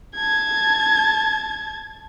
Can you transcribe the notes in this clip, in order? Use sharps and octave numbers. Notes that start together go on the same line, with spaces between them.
A5 G#6